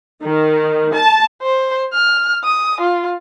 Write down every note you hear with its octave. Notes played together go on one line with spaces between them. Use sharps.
D#3
A5
C5
F6
D#6
F4